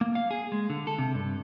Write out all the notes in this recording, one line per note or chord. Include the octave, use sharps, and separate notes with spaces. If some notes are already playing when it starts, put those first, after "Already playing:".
A#3
F5
G#4
G#3
D3
A4
C3
G2